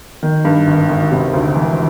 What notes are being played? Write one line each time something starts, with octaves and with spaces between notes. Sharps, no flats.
D#3
G2
G#1
G#1
C3
D2
E3